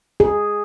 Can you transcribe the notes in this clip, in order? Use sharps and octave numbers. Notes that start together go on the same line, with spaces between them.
G#4